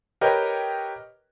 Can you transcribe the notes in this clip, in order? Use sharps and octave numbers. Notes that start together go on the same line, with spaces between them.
G4 A#4 B4 C#5 D#5 G5